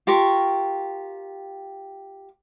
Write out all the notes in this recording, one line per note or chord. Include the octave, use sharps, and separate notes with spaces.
F4 G4 A#4 C#6